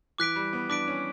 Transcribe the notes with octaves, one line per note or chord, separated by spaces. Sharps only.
E3 D6 F#6 B6 D7
G3
B3
D4 D6 F#6 B6 D7
C#4